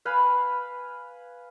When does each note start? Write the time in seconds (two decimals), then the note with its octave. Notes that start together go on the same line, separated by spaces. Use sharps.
0.05 B4 F5 G#5 B5